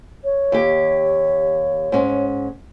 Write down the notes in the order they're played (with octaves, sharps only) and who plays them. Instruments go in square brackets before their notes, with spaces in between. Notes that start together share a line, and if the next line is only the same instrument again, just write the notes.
[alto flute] C#5
[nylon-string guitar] D#2 G4
G#2 C#4